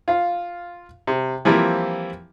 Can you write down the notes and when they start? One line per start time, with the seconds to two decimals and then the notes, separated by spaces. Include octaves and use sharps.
0.08 F4 F5
1.07 C3
1.45 E3 F3 G3 A#3 C4 E4